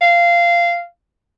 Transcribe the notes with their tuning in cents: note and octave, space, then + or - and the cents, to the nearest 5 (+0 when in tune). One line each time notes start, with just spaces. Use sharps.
F5 -15